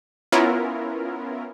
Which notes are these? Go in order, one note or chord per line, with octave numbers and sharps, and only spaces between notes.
B3 C#4 E4 F4 A#4